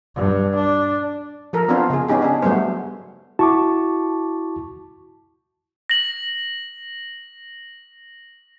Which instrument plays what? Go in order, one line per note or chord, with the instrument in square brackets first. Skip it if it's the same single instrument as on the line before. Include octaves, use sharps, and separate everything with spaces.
[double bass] G2
D4
[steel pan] F3 A4 A#4
B3 C4 D4 F4 C5
C#3 G#4
B3 C#4 D#4 G4 G#4
D4 G#4
F#3 G3 A3 B3 C5
[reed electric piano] E4 F#4 [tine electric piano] A5 C#6 D6
[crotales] A#6 F#7